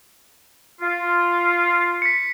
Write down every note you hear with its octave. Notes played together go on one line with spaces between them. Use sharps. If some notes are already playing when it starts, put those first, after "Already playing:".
F4
B6 C#7